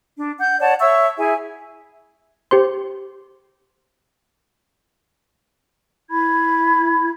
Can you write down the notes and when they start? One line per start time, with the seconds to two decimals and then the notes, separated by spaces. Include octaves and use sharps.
0.17 D4
0.40 F#5 G6
0.60 C#5 D5 F#5 A5
0.80 C#5 E5 C#6 E6
1.17 E4 G#4 E5 G#5
2.51 G4 C5 C6
6.09 E4 B5 G#6